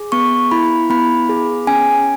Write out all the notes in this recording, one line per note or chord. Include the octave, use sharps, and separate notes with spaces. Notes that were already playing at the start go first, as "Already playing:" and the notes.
Already playing: G#4
B3 C#6
E4 B5
B3 B5
G#4
C#4 G#5